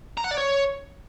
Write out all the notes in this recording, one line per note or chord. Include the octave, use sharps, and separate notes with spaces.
A#5
F#5
D5
C#5